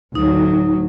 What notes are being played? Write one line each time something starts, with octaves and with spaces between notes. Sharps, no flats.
D2 A2 F#3 D#4